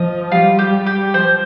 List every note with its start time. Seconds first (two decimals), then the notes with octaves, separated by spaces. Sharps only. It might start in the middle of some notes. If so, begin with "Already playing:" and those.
Already playing: F3 D#5
0.32 G3 F4
0.59 G4
0.73 G3
0.86 G4
1.14 F3 C5